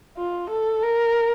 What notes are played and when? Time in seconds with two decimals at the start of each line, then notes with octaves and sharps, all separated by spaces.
0.17 F4
0.50 A4
0.82 A#4